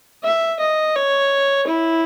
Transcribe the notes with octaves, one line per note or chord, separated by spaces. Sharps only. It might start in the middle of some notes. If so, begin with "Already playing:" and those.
E5
D#5
C#5
E4